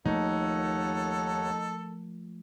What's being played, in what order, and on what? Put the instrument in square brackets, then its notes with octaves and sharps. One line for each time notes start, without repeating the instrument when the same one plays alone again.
[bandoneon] D#2 C#5 F#5 [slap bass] F3 A3 A#3 [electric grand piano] D#4 [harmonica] A4